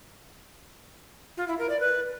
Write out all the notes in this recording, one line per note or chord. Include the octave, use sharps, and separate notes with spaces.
F4
E4
A#4
D5
B4